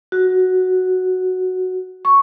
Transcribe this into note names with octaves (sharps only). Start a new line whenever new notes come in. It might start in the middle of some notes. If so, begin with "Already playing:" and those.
F#4
C#6